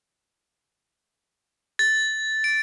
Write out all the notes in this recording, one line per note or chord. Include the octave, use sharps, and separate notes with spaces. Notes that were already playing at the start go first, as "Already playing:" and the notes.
A6
D7